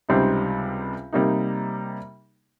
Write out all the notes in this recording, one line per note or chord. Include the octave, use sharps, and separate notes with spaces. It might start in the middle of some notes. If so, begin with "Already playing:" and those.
C#2 C3 G3 C4 D#4
C3 G3 A#3 D#4